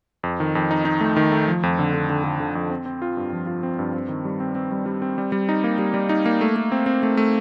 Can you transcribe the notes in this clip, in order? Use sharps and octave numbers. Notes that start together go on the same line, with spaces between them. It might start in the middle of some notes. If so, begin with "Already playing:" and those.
F2
D#3
F2
D#4
D#4
A3
D#3
A3
F3
F2
D3
D3
D3
D3
D3
F2
C4
C4
F4
G2
F3
F4
C4
G2
C4
D#3
G3
C4
C4
G3
G3
C4
G3
G3
D#4
A#3
G3
G3
D#4
A#3
A3
A3
C4
C4
A3
A3